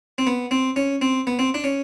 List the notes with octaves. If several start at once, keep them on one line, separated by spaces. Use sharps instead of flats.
C4
B3
C4
C#4
C4
B3
C4
D4
C#4